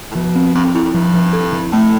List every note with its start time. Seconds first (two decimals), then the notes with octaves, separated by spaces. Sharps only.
0.11 A2
0.15 B2 F3
0.36 C4
0.55 G2 C4
0.64 F2
0.75 F2 E4
0.85 F2
0.94 G2 F3
1.14 F3
1.33 A4
1.53 F3
1.72 A2 A3